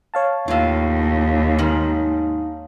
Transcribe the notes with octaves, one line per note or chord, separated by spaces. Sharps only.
C#5 F5 A5
D#2 A2 F4
G#2 D#3